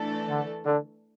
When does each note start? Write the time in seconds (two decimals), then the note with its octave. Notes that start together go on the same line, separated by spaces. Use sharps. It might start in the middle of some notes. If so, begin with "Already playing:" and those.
Already playing: E3 A3 D4 A4
0.28 D3
0.64 D3